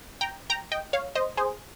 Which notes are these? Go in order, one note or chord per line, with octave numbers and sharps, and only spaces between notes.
G5 A#5
G5 A#5
D#5 G5
C#5 F5
C5 D#5
G#4 C5